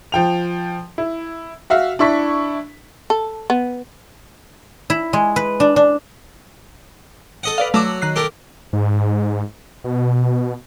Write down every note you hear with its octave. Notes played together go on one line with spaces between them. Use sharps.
F3 G5 F7
E4
F#4 E5 F5
D4 E4 C#6 B6
A4
B3
E4
G#3
B4
D4
D4
A4 D#5 F#5
B4 D5 F5
F#3 A3 F#4 D6
D#3 F#6 C7
G4 A4 A#4
G#2
B2